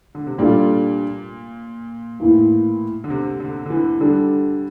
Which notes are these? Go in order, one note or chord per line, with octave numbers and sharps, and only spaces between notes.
D3
C3
A#2 G3 D4 F4 A4 D5
A2 E3 A#3
D3
C3
D3
D3
E3
D3 G3 D4 A4